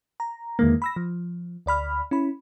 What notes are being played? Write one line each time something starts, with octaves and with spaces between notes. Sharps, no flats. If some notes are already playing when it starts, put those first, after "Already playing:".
A#5
E2 D3 D#3 G#3 A#3
B5 E6 A#6
F3
D2 D5 B5 F6
C#4 E4 B5